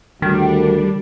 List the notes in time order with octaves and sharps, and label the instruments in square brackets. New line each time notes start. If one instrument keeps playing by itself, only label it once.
[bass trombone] D2 [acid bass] D#3 [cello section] G3 D4